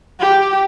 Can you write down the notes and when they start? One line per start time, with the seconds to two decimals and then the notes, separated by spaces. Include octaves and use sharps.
0.19 G4